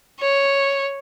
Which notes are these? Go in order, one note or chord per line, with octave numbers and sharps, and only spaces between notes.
C#5